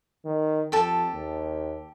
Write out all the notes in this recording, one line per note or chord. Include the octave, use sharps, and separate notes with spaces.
D#3
F2 G4 A4 A5
D#2